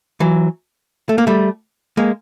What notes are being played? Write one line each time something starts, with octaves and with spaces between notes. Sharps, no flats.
E3 F#3
A3
A#3
G3 A3
G#3 A#3